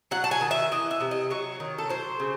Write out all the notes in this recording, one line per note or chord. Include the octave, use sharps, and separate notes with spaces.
F#3 F#5
A5
G#5
D#3
E5
E3 D#5
E5
C3
D#5
F#3 C#5
D#3
A4
F#3 C5
C#3